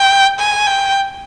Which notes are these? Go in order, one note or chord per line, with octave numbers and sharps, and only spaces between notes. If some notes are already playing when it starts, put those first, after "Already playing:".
Already playing: G5
G#5
G5